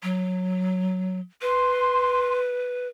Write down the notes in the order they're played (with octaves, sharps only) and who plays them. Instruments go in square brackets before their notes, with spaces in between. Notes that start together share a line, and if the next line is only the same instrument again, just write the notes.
[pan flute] F#3
[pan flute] B4 [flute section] C6